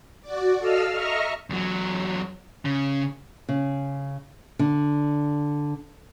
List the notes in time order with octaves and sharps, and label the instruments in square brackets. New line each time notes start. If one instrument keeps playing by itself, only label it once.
[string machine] F#4 D5
A4 D#5 F5 E6 F6
D#5 E5 A#5 C#6 F6
[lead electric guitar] E2 F#3
C#3
[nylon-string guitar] C#3
D3